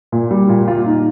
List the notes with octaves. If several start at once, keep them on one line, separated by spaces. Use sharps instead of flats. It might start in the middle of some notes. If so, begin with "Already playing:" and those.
A#2
G3
A#2
F4
D#4